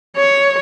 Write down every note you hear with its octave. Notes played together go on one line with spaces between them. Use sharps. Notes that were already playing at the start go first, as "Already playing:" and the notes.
C#5